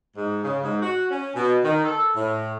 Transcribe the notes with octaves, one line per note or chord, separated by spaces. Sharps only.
G#2
C#3
G#2
F#4
C#4
B2
D#3
A4
A2